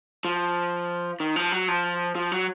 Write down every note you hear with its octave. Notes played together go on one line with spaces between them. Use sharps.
F3
D#3
F3
F#3
F3
F3
F#3